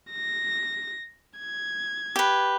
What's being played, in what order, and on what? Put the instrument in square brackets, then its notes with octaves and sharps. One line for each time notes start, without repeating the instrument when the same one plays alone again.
[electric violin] A#6
G#6
[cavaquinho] G4 B4